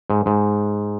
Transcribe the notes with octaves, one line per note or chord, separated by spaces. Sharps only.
G#2
G#2